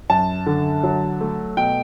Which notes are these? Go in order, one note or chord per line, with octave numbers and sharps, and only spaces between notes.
F#2 A5
D3
F#3
A3
B2 G5